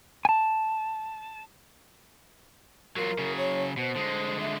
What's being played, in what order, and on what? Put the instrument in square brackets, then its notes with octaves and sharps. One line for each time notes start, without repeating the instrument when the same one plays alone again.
[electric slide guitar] G#5 A5
[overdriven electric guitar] F#3 F4 [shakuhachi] A#4
[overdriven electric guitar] C#3 F#3
[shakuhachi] C#5
[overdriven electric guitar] B2 [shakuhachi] C5
[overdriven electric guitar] D3 G#3
[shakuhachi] E5